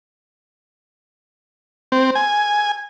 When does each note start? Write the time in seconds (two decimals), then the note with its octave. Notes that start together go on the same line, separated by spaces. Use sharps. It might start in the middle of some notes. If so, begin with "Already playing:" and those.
1.92 C4
2.15 G#5